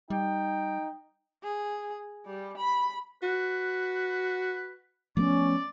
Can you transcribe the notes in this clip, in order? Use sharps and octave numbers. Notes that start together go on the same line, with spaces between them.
G3 D#4 G5
G#4
G3
B5
F#4 B4
F3 A3 B3 C#4 D5